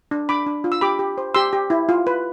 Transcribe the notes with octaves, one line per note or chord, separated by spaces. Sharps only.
D4
D4 B5 D6
D4
F4
E6
G4 B5 D6
G4
C5
G4 C6 E6
G4
E4
F4
B4